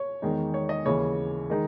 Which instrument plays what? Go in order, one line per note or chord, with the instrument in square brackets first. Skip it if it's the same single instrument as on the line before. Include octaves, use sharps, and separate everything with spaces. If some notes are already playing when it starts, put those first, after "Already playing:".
Already playing: [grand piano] C#5
E2 D#3 G#3 D#4
C#5
D#5
D#2 C#3 E3 C#5
D#3 G#3 D#4